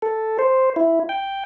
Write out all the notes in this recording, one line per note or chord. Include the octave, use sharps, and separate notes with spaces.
A4
C5
E4
G5